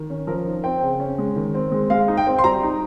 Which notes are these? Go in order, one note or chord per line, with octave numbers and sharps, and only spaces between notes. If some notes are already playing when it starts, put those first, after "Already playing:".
Already playing: D#3
C#4
F3 A#4
D#4
C4 G5
C#3
C#4
G#3
D#3
C4
G#3
G#3 F5
D#4
G5
C4
C6
G3 A#5
D#4